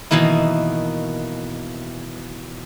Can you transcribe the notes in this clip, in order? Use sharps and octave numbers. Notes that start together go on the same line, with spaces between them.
B2 D#3 E3 A#3 E4